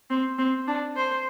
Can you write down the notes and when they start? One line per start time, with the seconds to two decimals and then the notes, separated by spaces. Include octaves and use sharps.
0.10 C4
0.38 C4
0.68 D4
0.97 C5